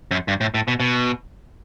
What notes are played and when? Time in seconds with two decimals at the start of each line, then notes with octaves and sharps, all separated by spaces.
0.11 F#2
0.28 G2
0.41 A2
0.54 A2
0.68 B2
0.80 B2